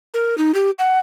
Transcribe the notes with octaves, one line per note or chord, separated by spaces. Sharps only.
A#4
D#4
G4
F#5